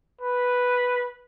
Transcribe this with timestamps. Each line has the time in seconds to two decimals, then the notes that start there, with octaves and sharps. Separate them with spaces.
0.21 B4